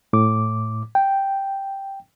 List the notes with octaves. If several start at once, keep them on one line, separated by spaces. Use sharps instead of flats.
A2 D6
G5